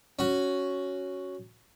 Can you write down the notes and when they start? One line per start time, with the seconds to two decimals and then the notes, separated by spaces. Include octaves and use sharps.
0.19 C#4 F#4